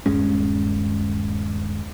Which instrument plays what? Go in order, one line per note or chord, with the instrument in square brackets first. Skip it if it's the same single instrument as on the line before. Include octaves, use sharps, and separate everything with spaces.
[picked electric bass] D#1 G2 G#3 C#4